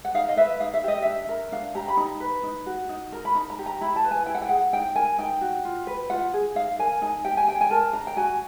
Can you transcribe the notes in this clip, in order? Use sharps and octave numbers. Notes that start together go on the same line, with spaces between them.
F#5
D#4 F5
D#5
B4 E5
D#4 F5
E5
G4 D#5
D4 E5
A#4
D4 F5
G4 A#5
B5
D#4 A#5
B4
D#4
F#4
D#4
A#4
B5
D#4 A#5
A#5
G4
A#5
E4 B5
A5
B4
G#5
E4 G5
F#5
G5
G#4 F#5
D#4 G5
A#4 G#5
D#4 G5
F#4
F4
B4
F4 F#5
G#4
D#4 F5
A#4 G#5
D#4 G#5
G4 G5
G#5
D4 G5
G#5
A#4 A5
D4 A#5
G5
F#4 G#5